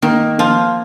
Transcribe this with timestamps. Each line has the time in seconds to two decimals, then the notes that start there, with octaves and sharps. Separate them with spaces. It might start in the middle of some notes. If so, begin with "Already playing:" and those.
0.02 D#3 A#3
0.38 F3 A#3